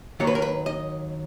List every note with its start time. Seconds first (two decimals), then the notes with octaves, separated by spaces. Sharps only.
0.20 D#2 D#3 F#3 A#3 C#5
0.27 B4
0.35 A#4
0.42 B4
0.66 D#5